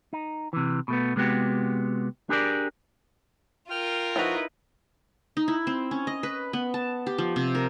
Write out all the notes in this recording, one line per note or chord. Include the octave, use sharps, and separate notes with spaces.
D#4
C3 E3
B2 A3 B3
C3 G#3 B3 F#4 G4
D4 G4 G#4 A#4 D5
F4 A#4 G5 F6
F3 D#4 E4 F#4 B4
D#4
E4
C4
C#4
D#5
B4
B3
A5
G4
F3
C3
A#4